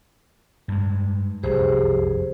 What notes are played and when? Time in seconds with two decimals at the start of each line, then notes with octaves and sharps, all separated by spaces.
0.68 G2 G#3
1.43 F1 C2 F#2 G4 G#4 C5